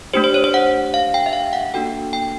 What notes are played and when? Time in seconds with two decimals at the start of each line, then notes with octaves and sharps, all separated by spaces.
0.14 A3 D4 G4 C5
0.24 C5
0.34 C#5
0.44 C5
0.54 F#5
0.94 F5
1.14 G5
1.26 E5
1.33 F5
1.53 F#5
1.74 A#3 D4 F#4 A4 G5
2.13 G5